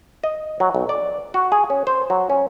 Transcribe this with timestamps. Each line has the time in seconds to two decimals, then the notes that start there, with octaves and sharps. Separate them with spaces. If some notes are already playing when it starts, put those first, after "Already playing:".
0.24 D#5
0.60 F#3
0.75 B1
0.89 D5
1.34 F#4
1.52 G#4
1.70 C#4
1.87 C5
2.10 F#3
2.30 C#4